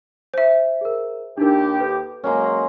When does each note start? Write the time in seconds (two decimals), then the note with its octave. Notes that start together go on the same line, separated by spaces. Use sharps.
0.34 C5 E5
0.81 G#4 A#4
1.38 D#2 D4 D#4 G4 A#4
1.80 A4 B4
2.24 F#3 G#3 A#3 C#4 A#5 C6